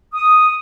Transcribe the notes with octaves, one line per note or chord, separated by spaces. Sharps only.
D#6